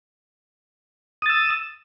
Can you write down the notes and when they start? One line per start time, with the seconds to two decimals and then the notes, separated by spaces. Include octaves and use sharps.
1.22 D#6
1.26 A6
1.30 E6